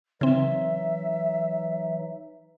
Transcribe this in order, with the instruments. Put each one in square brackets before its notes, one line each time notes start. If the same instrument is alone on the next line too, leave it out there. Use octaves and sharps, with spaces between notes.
[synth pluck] C#3 C4 [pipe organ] E3 F#3 D#4 [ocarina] E5